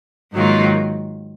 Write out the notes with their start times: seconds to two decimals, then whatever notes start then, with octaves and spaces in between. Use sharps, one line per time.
0.32 G#2 D#3 F#3 A#3 F4